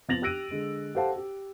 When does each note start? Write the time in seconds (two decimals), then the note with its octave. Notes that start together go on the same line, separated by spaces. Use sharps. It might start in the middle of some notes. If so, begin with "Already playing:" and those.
0.08 F3 B3 A6 A#6 F7 F#7
0.22 G4 E6 F#6 A#6 D7 D#7
0.51 D3 G#3
0.95 G4 A4 C5 F5 F#5 A5
1.16 G4